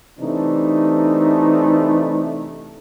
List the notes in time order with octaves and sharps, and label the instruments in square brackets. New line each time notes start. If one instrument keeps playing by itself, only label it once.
[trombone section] C3 E3 A3 D4 D#4